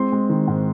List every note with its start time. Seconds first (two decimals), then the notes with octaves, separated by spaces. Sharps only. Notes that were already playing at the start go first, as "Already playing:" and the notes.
Already playing: G#3 C4 C6
0.12 G#3
0.29 D#3
0.47 G#2